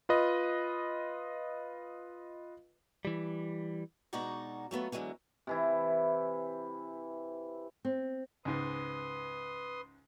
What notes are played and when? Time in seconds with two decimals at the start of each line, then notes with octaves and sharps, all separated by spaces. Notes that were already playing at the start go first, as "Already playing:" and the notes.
0.09 F4 B4 D#5
3.05 E3 G3
4.13 B2 G#3 D#4 F#4 D5 A#5
4.71 F#3 A3 B3 F4
4.92 D3 E3 F#3 G#3 A#3
5.47 C3 E3 E4
7.85 C4
8.45 C#2 G#2 B4 C6 D#6